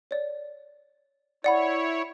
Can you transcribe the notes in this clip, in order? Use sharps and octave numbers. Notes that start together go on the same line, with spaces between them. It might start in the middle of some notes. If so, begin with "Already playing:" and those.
C#5 D5
E4 C#5 D5 F#5 B5